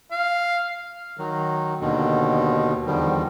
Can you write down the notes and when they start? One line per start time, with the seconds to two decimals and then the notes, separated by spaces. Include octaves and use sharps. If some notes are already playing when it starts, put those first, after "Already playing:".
0.11 F5
1.17 D#3 F#3
1.81 D#2 B2 D3 D#3
2.86 E2 D3 D#3 F3 G3